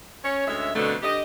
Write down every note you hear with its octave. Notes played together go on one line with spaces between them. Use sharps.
C#4 C#5
D2 G#3 C#4 E5
F2 B2 D3 A3
D3 G4 D#5